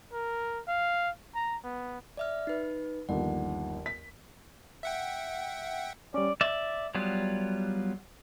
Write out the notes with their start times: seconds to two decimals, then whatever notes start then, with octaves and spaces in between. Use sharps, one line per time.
0.13 A#4
0.68 F5
1.35 A#5
1.64 B3
2.17 D5 E5 F6
2.47 D#4 B4
3.09 G1 D#2 F3 F#5
3.86 B6
4.83 E5 F#5 G5
6.14 G3 C#4 D5
6.41 D5 E5
6.95 F#3 G3 B3 F4